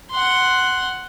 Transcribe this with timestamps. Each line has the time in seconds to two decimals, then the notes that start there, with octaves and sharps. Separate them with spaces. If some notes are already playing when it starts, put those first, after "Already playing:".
0.11 F#5 C6